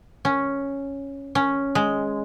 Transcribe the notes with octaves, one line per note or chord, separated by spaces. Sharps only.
C#4
C#4
G#3